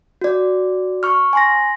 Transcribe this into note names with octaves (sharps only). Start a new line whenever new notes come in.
F#4 D5
C#6 F6
G#5 C6 A#6